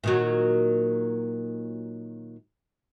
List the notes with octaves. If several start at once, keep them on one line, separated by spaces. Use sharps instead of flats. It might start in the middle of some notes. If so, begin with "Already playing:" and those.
A#2 D#3 F#3